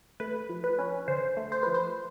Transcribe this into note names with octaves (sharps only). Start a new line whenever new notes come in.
A3 B4
F3
B4
C#4
D3 C5
A3
C5
F3 B4
C5